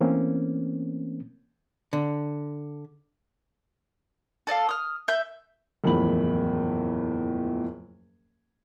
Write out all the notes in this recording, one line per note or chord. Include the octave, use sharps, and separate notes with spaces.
E3 A3 A#3 C4 C#4
D3
A4 D5 D#5 F5
D#6 F6
E5 G6
F#1 E2 A2 F3 B5 F#7